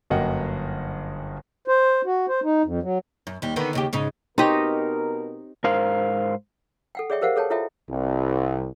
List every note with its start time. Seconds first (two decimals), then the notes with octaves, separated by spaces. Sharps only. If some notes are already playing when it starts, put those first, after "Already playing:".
0.10 G1 F#2 A#3 D#5 F#5 G5
1.68 C5
2.06 F#4
2.29 C5
2.44 D#4
2.65 F2
2.83 F#3
3.27 F#2
3.42 D#2 G3
3.56 D3 D#3 B3
3.73 D#2 C#3 G4
3.93 G#2 C#3 D#4
4.38 B2 C4 D#4 G4 A#4 C#5 D#5
5.64 G#2 A#4 C5 F5
6.95 A4 F#5 G5
7.10 G#4 C#5 D5 E5 G5 C#6
7.21 G4 A#4 C5 F5 F#5
7.36 G#4 A4 C#5 G5 A5
7.50 E4 F4 A4 C#5 E5 G5
7.89 C2